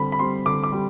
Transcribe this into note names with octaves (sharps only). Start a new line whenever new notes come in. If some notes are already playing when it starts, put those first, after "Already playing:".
Already playing: D3 G3 C4 B5
B5
G3 C4 C6
D3 D6
D6
G3